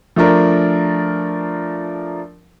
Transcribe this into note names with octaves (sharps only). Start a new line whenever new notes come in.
F3 A3 D4 A#4